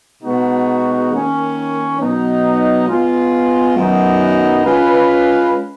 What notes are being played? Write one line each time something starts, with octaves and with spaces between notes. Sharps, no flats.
B2 G#3 B3 D#4 F#4
D#3 A#3 C#4
B2 F#3 B3 D#4
G#3 B3 F4
F#2 D#3 F#3 B3 D#4
G#3 C#4 F4 B4